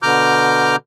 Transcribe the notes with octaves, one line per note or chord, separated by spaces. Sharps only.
B2 D3 A#5 D6 F6 G6